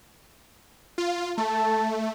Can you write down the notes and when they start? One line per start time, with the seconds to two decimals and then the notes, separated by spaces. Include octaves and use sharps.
0.98 F4
1.38 A3 A4 A5